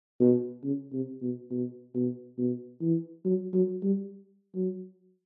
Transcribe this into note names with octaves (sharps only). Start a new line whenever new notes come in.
B2
C#3
C3
B2
B2
B2
B2
E3
F#3
F#3
G3
F#3